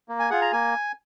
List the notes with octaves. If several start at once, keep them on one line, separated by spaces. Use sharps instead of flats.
A#3
G#5
F4 G#4 F#5
A#5
A#3 G#5